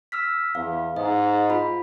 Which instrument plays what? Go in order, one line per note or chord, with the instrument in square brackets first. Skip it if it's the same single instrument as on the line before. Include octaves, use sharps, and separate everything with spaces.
[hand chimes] E6 F6 B6
[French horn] E2 [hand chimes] F5
[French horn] G#2 [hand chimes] D#5
[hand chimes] F4 B5